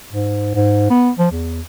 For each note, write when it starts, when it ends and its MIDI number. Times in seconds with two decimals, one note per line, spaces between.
0.12 0.53 44
0.55 0.90 44
0.90 1.10 59
1.19 1.30 53
1.31 1.61 40